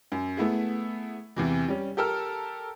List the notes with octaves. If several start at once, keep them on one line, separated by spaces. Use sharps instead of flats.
F#2
A3 B3 E4 G#4
E2 C3 E3
G3 C#4
G4 A4 A#4 E6 F6